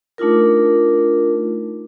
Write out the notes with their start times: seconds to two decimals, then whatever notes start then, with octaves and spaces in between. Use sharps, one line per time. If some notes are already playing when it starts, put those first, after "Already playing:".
0.18 A3 D4 D#4 F4 A#4